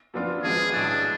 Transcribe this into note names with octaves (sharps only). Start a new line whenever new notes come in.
F#2 F3 B3 D4 F4
G#1 F#2 F3 G#3 B3 G#4
B1 A2 G#3 D4